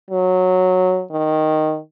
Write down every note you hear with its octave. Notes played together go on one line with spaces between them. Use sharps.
F#3
D#3